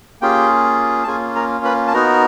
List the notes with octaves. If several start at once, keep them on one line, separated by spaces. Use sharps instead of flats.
A#3 C#4 F4 G4 G#4 G5
A5
A#3 C#4 F4 G#4 G#5
A#4 A#5
B4 B5
A5
B3 D#4 F#4 A#4 A#5